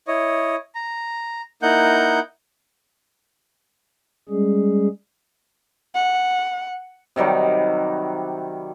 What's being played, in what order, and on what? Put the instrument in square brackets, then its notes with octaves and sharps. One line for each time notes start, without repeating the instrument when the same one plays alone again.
[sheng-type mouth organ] E4 C#5 D#5
A#5
A#3 D#4 E4 F#5 G6
[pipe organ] G3 G#3 C#4 G#4
[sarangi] F#5
[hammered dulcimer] C3 D#3 F#3 G3